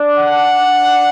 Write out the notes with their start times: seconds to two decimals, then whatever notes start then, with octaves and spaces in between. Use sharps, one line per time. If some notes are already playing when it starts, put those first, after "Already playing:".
Already playing: D4
0.18 F#5